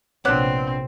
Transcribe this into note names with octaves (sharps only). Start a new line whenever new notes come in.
A#1 C3 B3 C4 D4 C#5 D6 F#6